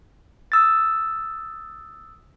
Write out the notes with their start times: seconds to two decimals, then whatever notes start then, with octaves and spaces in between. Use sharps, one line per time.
0.52 D#6 E6 A6